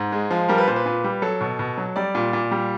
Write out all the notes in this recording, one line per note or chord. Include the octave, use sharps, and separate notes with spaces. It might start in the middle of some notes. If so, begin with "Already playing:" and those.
Already playing: G#2
G#3
F3
G3 A#4
B4
A#2 C5
B4
A#2
G3
F#3 A4
B2
B2
F#3
G3 D5
A#2
A#2
G3